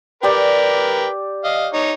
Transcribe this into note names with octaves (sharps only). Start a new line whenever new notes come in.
G4 A#4 B4 D5 G5
D#5 F5
D#4 C#5